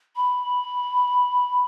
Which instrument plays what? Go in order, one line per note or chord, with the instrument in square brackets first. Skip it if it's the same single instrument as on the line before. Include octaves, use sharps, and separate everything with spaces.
[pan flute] B5